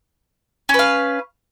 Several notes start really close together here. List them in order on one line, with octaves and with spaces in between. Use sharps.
C#4 B4 F5